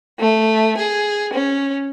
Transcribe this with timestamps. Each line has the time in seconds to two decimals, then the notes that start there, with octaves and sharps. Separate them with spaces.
0.20 A3
0.78 G#4
1.33 C#4